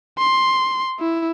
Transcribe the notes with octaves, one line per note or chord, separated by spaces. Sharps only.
C6
E4